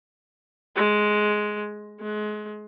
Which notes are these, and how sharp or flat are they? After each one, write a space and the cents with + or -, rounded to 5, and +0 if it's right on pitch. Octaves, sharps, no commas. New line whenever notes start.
G#3 +10
G#3 +30